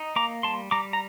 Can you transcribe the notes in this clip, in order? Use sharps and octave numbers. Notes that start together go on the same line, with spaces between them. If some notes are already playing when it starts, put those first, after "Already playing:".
Already playing: D#4
A#3 A#5 D6
G3 A5 C6
G3 A#5 D6
A#5